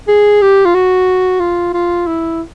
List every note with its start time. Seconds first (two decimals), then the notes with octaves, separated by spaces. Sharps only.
0.08 G#4
0.42 G4
0.65 F4
0.74 F#4
1.40 F4
1.73 F4
2.06 E4